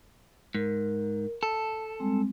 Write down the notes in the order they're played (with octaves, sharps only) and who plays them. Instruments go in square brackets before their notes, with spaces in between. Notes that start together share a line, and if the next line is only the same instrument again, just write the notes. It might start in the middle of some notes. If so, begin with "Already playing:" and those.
[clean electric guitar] G#2 [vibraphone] A#4
[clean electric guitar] A4 [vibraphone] A5
[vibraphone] G3 G#3 C4